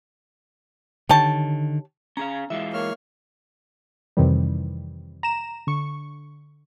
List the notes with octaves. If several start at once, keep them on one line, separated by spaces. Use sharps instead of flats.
D3 D#3 G4 C#5 A5
C#4 G#4 F5 A#5
E3 G#3 F4 E5
A#3 C#5 F6
F2 C3 D#3 E3 G3
A#5 E7
D3 C#6